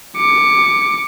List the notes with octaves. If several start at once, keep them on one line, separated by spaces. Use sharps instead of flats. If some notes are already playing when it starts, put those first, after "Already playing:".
D6 C#7